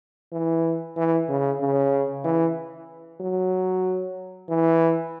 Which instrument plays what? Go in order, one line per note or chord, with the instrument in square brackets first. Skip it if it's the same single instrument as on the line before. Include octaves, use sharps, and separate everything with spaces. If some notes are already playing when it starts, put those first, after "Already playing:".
[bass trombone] E3
E3
C#3
C#3
E3
F#3
E3